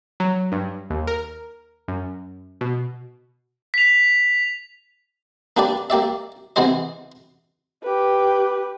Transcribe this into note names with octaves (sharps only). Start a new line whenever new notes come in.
F#3
G2
D#2
A#4
F#2
B2
B6 F7
A#3 D4 G4 B4 D5
A#3 G4 D5 E5
C3 E3 B3 G#4 C5 D#5
G4 B4